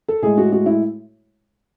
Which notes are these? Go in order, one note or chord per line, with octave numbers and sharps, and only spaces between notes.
A4
A2 G#3 G#4
F#4
F#4
E4